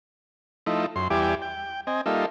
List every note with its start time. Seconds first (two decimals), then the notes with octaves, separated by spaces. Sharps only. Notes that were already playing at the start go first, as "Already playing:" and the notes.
0.66 F3 A3 D#4 E4
0.96 F#2 C6
1.10 E2 G3 E4 G4 G#5 D6
1.42 G5
1.87 C4 D#5 G#5
2.06 G3 A#3 D#4 F4 A4 E5